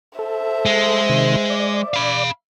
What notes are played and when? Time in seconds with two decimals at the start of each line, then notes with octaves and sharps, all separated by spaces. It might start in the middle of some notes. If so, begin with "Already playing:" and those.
0.19 A4 C5 E5
0.65 G#3
1.10 C3 D#3 C6
1.50 D5
1.94 F5 B5